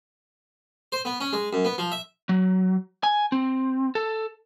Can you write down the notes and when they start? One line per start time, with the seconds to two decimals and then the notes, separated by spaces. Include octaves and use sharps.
0.92 C5
1.05 B3
1.20 C#4
1.33 G#3
1.53 F#2
1.65 B3
1.78 F3
1.92 E5
2.29 F#3
3.03 G#5
3.32 C4
3.95 A4